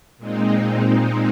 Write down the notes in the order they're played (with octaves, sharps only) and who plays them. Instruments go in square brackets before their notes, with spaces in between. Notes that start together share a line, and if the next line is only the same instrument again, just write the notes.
[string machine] A#2 G#3 C4 D#4